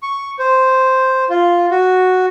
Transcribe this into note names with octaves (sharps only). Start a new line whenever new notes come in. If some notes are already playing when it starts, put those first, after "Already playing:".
C#6
C5
F4
F#4